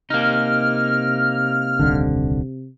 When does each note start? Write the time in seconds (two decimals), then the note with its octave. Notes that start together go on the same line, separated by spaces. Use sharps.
0.10 C3 A#3 D#4 F6
1.79 D#1 C2 D3